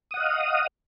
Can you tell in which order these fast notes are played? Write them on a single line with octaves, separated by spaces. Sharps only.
D#6 F#5 D#5 F5